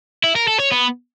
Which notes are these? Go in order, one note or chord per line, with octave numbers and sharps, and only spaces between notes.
E4
A#4
A4
C#5
B3